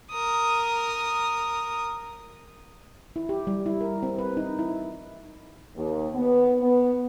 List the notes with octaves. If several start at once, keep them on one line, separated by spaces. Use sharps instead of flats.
A#4 D#6
E4
G4
G3
E4
A#4
C4
B4
D#4
E4
D#2
B3
B3